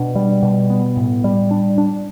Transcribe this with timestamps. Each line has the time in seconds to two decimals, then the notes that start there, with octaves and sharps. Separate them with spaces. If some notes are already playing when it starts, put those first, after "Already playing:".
Already playing: B2 D4
0.15 G3
0.43 B2
0.70 B3
0.97 A2
1.24 G3
1.51 D4
1.78 D4